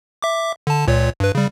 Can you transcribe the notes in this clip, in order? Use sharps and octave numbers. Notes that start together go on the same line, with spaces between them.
E5 D6
D3 A5
C#2 A#2 C#5
G2 B4
C#3 G3